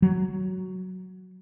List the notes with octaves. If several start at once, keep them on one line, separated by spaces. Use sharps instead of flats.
F#3